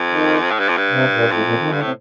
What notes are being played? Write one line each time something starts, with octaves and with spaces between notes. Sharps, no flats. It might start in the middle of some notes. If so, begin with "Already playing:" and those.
Already playing: F2
D#3
A2
G2
F2
G2
C3
A#2
F2 A2
A#2
D#3
G2 D3
A2 C3